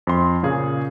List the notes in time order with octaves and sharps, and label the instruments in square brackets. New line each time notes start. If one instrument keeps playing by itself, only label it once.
[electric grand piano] F2 C6
A#2 C#3 G#4